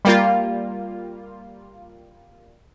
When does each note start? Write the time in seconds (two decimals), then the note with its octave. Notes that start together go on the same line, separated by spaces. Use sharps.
0.05 G3 A#3 F4